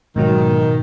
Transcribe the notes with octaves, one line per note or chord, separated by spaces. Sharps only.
G#2 B2 D#3 F#3